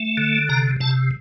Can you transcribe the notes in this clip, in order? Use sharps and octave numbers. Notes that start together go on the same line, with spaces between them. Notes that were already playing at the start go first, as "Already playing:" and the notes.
Already playing: A3
D3
C3 A#5
C3 A5